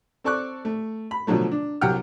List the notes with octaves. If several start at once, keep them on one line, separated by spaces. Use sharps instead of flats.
C4 A4 D5 C#6 D6 F#6
A3
B5
B2 D3 F3 F#3 A3
D4
C2 F#3 G4 F#5 G5 F6